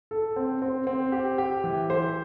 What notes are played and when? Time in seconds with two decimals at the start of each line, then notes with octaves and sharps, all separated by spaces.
0.11 A4
0.36 C4
0.62 C4
0.87 C4
1.12 G4
1.38 G4
1.64 E3
1.90 C5